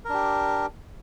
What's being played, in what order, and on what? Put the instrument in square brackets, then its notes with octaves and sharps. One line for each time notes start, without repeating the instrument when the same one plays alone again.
[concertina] A#4
D4
G4